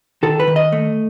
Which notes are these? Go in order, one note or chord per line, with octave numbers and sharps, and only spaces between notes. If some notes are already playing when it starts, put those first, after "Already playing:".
D#3 A4
B4
D#3
D#5
A3